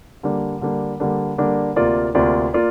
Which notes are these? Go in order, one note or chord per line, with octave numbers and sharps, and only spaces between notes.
D3 G3 A#3 D4
D3 G3 A#3 D4
D3 G3 A#3 D4
D3 G3 A#3 D4
D2 C3 A#3 F4 D5
D2 C3 A#3 F4 D5
A#3 F4 D5